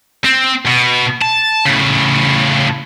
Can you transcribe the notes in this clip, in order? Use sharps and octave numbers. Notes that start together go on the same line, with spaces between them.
C4
B2
A5
A2 C#3